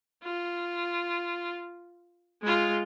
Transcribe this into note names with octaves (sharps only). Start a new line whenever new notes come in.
F4
G#3 F4